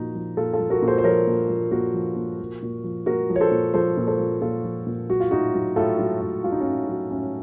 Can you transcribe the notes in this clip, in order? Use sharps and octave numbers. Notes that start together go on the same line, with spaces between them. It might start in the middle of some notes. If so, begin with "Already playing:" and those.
Already playing: A#2 F3 D#4 F#4
F3
A#2 F4 A4
F4 A4
F3
F#4 A#4
A#2
A4 C5
C5
F3 A#4 C#5
A#2
F3
A#2 F#4 A#4
F3
A#2
F3
A#2
F3
A#2 F#4 A#4
F3
C#5
A4 C5
A#2
F3 A4 C5
A#2
A4 C5
F3
A#2 F4 A4
F3
A#2
F#3 F#4
F4
A2 D#4 F#4
F#3
A2 F4 A4
F#3
A2
F#3 F4
D#4
C#4 F4
A2
F#3
A2 C#4